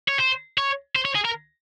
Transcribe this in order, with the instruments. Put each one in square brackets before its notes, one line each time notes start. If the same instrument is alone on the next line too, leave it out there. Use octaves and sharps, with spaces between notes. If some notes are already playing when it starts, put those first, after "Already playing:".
[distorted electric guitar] C#5
C5
C#5
C5
C#5
G#4
A#4